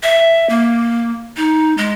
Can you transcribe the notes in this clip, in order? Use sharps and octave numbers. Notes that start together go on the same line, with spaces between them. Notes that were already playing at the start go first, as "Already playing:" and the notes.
E5
A#3
D#4
G#3